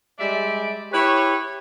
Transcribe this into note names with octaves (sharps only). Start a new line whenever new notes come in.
G3 G#3 D5 E5
E4 G4 B4 C#5